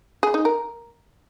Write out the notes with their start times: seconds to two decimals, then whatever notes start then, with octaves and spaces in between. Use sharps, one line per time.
0.23 G#4
0.34 D#4
0.45 A#4